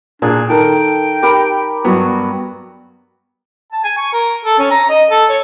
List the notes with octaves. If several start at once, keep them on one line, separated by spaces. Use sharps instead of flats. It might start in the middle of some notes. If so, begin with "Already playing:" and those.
A#2 D4 G#4
D#3 A4 A#4 G5
G4 A#4 B5
G2 F#3 B3 F#4
A5
G#5
C#6
A#4
A4
C#4
A#5
D#5
A4
C#5